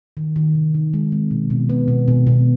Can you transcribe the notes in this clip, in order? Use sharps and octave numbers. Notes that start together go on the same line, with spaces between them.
D#3
D#3
C3
D#3
G#3
C4
B2
B2
B3
B2
B2
B2